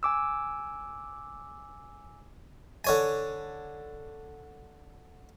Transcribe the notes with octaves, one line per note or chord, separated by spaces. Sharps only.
G#5 D6 E6
D3 C#5 G#5